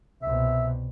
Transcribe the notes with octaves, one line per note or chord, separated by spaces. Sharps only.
C2 B2 E5